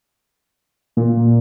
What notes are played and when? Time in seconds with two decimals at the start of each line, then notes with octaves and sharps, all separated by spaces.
0.97 A#2